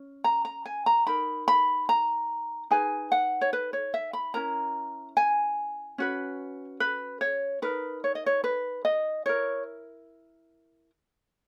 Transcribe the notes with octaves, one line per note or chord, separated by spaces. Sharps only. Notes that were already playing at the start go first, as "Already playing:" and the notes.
Already playing: C#4
A#5
A#5
G#5
A#5
D#4 A#4 B5
B5
A#5
D#4 G#4 B4 G#5
F#5
C#5
B4
C#5
E5
B5
C#4 E4 A#4 A#5
G#5
C#4 F#4 B4
B4
C#5
D#4 A#4 B4
C#5
D#5
C#5
B4
D#5
E4 A#4 C#5